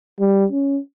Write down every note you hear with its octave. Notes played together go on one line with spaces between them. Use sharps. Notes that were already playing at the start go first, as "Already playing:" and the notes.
G3
C#4